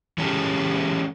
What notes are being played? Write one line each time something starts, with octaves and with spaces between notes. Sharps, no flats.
E3 G#3 C#4 G4 A4